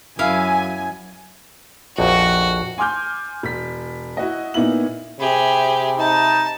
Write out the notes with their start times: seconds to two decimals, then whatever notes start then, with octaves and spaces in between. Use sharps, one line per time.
0.19 F#2 E4 F5 G#5
1.99 A#1 F2 F#4
2.78 G#5 C6 D6 F6 G6
3.43 E1 B6
4.17 E4 F#4 D#5
4.54 A#2 B3 D#4 E4 F#7
5.20 C3 G4 G#4 C5 E5 B5
5.99 D#4 A5